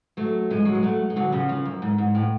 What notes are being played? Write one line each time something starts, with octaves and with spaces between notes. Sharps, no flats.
F#3 A3
F3 G#3
F#3
G#3
F#3 A3
G#3
D3 F#3
C#3 F3
C#3 F3
F#2
G#2
G#2
A2